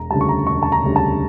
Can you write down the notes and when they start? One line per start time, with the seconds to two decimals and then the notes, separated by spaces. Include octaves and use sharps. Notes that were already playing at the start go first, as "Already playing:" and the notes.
Already playing: E1 A#5
0.10 D2 C#3 G3 A5
0.21 C#6
0.29 A#5
0.47 E1 C#6
0.63 A5
0.72 A#5
0.84 D2 C#3 G3
0.96 A5